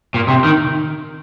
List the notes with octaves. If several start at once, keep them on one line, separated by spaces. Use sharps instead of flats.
A#2
C3
D#3